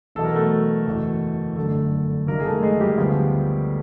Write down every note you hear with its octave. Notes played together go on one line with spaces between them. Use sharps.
E1 E2 B2 F#3 A4
A#4
A3 A4
F#1 E2 B2
G1 F#2 D3 A3 A4
F#1 F#2 D#3 G3 A#3 A#4
G#4
A3 A4
G#3 G#4
G3 G4
D2 D3 F3 G#3 B3